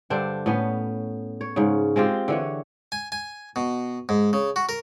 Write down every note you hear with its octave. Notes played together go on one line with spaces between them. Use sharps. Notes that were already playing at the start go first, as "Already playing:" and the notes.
G2 D3 D4 C5
A2 B3 C#4
C#5
G#2 C#3
G#3 C4 F4 G4
D3 E3 C#5
G#5
G#5
B2
G#2
C#3
F#4
A#4